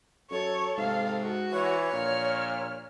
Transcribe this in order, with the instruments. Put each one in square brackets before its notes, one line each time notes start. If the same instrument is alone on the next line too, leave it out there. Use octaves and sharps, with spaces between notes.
[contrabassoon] F#2 [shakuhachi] A4 [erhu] C#5
[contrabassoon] G#2 [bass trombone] C3 [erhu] F5
[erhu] F#4
[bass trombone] E3 [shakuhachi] C#5
[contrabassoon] A#1 [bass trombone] A#2 [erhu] F6